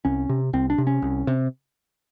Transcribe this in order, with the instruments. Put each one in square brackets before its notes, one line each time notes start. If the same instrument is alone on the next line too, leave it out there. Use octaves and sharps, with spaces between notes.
[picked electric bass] C2 C#4
C3
C2 C4
D4
C3
C#4
C2
C3